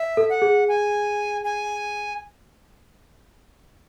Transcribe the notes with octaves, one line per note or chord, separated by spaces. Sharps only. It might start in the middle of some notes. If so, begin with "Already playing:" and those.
Already playing: E5
A4
F#5
G#4
G#5
G#5